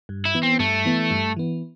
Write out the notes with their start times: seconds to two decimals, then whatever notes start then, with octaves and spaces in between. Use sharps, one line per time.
0.09 G2
0.25 E4
0.35 E3 B3
0.43 C4
0.59 G2 A3
0.85 E3 B3
1.11 G2
1.37 E3 B3